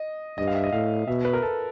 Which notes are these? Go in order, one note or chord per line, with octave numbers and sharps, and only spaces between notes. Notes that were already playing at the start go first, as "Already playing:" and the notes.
Already playing: D#5
G2 D#5
F5
E5
D#5
A2 F5
B2 E5
B4
A#4
A4